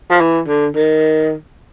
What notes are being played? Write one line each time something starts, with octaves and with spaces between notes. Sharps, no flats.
F3
E3
D3
D#3